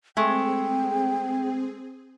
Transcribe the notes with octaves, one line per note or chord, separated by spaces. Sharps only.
G#3 A3 C4 G#4 G5